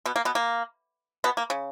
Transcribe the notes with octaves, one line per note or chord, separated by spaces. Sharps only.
B2 B3
A#3
B2 B3
A#3
B2 B3
A#3
C#3